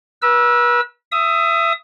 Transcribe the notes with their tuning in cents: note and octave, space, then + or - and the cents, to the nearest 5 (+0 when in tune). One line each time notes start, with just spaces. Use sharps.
B4 -40 E6 +0
E5 +25 D#6 +15